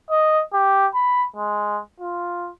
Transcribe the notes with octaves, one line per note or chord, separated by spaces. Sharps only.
D#5
G4
B5
G#3
F4